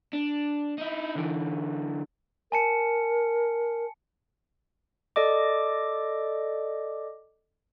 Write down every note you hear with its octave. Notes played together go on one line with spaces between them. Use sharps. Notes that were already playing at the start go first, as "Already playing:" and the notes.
D4
D#4 E4
D3 E3
A#4 G#5 A5 C#7
A4 D5 D#5 D6